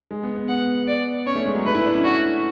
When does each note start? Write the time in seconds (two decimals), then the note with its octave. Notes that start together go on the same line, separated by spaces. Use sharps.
0.11 G#3
0.23 B3
0.36 B3
0.48 B3 F#5
0.88 D5
1.26 C#4 C#5
1.36 A3
1.45 G#3
1.55 F#3
1.66 A3 B4
1.75 E4
1.84 D4
1.94 C#4
2.04 D4 F#4